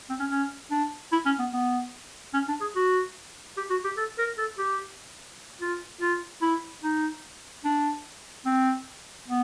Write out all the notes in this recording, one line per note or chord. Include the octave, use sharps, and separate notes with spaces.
C4
C#4
C#4
D4
E4
C#4
B3
B3
C#4
D4
G#4
F#4
G4
F#4
G4
A4
A#4
A4
G4
F4
F4
E4
D#4
D4
C4
B3